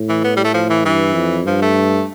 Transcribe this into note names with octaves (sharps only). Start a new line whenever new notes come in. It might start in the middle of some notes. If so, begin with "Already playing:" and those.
Already playing: A2
E3
B3
G3
A3
F3
E3
G2 E3
F2
G2 F3
A3